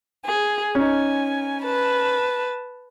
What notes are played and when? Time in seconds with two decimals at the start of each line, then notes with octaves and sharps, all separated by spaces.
0.25 G#4
0.75 C#4 D#4 G#5
1.64 B4 A5